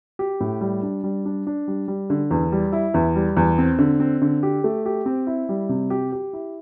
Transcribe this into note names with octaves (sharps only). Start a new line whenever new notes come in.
G4
A2
G3
D4
G3
D4
D4
G3
G3
D3
E2
G3
E4
E2
G3
E2
C4
D3
C4
D3
G4
A3
G4
C4
E4
G3
C3
G4
G4
E4